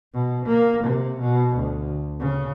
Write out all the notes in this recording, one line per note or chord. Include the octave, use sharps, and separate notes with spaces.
B2
A#3
C3
B2
D2
C#3